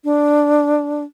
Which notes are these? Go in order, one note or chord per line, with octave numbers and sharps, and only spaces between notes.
D4